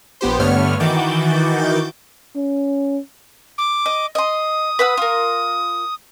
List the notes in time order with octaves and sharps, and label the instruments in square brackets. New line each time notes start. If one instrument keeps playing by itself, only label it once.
[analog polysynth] A#1 B3 G4 C5
G2 D3 A3 B3 C#5 F6
D#3 E3 F#4 D6 G6 A6
[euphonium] C#4
[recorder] D6
[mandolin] D#5
[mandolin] D#5 C6 [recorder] D#6
[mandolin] B4 F#5 E6
F4 A#4